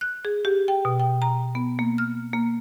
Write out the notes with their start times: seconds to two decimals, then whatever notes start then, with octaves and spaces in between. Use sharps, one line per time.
0.01 F#6
0.25 G#4
0.45 G4
0.68 G5
0.85 B2
1.00 G5
1.22 A#5
1.55 B3
1.79 A#3
1.98 F6
2.33 A#3